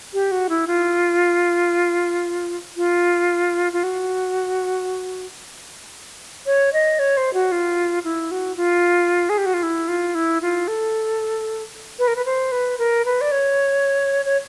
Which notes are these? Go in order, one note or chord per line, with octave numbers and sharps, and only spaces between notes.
G4
F#4
E4
F4
F4
F4
F#4
C#5
D#5
C#5
C5
F#4
F4
E4
F#4
F4
G#4
G4
F#4
F4
E4
F4
E4
F4
A4
B4
A#4
B4
C5
B4
A#4
B4
D5
C#5
C#5